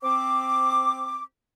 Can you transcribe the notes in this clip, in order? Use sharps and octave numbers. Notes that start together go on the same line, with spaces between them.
C4 D6